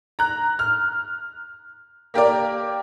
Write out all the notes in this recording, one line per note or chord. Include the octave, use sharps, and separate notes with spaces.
A#5 F#6
F6
A#3 G4 A#4 D5